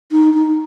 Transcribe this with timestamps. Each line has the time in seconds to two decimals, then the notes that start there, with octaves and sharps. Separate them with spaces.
0.12 D#4
0.34 D#4